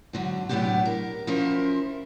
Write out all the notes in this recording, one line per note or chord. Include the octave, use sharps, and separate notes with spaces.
G#2 D3 F#3
A2 F#3 B3 C4 D4 G4
A#4
F3 C#4 E4 A#4 C5